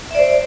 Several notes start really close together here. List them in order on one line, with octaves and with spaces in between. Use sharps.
E5 D5 C5